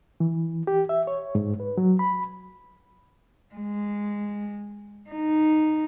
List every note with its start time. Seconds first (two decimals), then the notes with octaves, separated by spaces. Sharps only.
0.20 E3
0.67 G4
0.89 E5
1.07 C#5
1.35 G#2
1.60 B4
1.77 F#3
1.99 B5
3.55 G#3
5.10 D#4